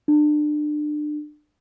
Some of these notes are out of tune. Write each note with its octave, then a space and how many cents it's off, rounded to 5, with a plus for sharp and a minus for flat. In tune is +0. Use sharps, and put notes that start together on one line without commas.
D4 +30